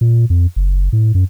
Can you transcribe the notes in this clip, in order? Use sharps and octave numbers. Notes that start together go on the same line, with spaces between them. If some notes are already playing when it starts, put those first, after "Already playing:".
A#2
F2
F#1
A2
F#2